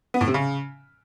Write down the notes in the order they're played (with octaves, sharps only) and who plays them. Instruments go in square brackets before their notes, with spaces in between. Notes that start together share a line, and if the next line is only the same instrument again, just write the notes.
[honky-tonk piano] B3
A2
C3
C#3